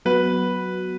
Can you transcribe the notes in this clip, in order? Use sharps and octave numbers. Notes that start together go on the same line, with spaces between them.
F#3 B3 F#4 B4